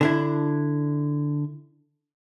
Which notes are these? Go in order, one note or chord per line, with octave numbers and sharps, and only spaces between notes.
D3 D4 E4